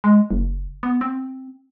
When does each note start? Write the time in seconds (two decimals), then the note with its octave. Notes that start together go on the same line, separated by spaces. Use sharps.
0.04 G#3
0.31 F#1
0.83 B3
1.01 C4